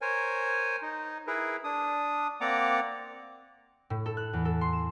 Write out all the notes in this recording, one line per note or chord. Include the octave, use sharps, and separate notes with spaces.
A#4 C5 C#5 G#5
D#4
E4 G#4 A#4 B4
D4 D#6
A#3 C4 D5 F#5 A#5 D6
A2
A4
F#6
E2
A4
C6
E7